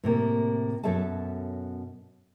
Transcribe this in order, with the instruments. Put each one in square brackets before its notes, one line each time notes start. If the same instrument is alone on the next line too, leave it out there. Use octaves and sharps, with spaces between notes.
[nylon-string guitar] A2 C3 A#3
F#2 B2 A4 C#5 E5 A5